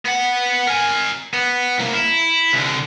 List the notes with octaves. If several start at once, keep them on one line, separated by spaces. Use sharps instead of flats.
B3 F#5
A#4 G#5
B3
C2 A#3
E4
C2 D3